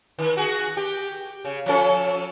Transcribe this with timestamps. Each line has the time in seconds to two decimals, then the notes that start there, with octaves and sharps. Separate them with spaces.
0.19 D#3
0.37 F#4 G#4
0.77 G4
1.45 C#3
1.66 F3 C#4 A4